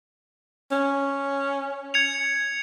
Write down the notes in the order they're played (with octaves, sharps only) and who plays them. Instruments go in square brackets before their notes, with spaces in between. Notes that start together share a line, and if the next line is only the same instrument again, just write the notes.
[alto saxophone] C#4
[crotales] G#6 C#7 F7